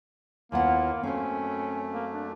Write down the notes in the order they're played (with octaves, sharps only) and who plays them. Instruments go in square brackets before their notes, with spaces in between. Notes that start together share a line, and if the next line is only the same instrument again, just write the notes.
[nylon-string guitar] D#2 B3 F#5 [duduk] A#3 [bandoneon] E4 F4
[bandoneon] F#2 A3 [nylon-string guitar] C4 C5 [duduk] C#4
[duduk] A#3
D4